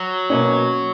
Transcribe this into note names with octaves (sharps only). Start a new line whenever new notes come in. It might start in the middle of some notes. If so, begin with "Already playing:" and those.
Already playing: F#3
B2 A#3 C#4